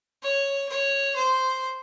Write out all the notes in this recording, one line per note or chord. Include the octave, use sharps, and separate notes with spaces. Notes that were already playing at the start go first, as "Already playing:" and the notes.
C#5
C#5
C5